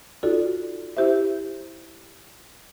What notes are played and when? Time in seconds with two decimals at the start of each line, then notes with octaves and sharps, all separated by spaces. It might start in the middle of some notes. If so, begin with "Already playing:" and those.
0.23 D#4 F4 F#4 A4 D5
0.97 E4 G4 C5 E5